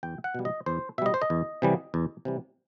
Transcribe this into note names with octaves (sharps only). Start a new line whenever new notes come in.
E2 G5
F#5
B2 G3
D#5
E2 C5
B2 G3 D#5 E5
C5
D#5
E2
C3 E3 G3
E2
C3 E3 G3